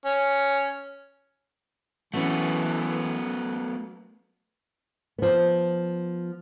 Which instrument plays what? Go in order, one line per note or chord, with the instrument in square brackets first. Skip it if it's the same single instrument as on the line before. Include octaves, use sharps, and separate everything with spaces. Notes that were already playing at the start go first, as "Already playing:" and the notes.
[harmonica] C#4
[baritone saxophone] E3 [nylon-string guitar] F#3 C#4 [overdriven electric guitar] A3 B3
[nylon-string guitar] F3 B3